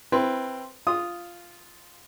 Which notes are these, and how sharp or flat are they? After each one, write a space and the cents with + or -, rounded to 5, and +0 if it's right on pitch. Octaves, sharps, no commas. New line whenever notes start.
C4 +0 E4 +15 B4 +0
F4 -5 D#6 +0